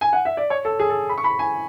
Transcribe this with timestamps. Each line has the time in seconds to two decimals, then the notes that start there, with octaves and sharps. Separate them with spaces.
0.01 G#5
0.13 F#5
0.25 E5
0.37 D5
0.50 C#5
0.65 A4
0.79 G#4
0.90 A4
1.09 B5
1.18 C#6
1.24 B5
1.39 G#5